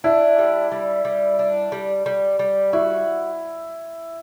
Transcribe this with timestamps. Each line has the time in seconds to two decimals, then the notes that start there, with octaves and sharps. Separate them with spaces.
0.04 D4 E4
0.39 G3
0.71 G3
1.05 G3
1.39 D4
1.72 G3
2.06 G3
2.39 G3
2.73 E4 F#4